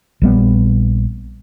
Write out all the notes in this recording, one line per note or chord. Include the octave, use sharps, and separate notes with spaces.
A#1 G3 B3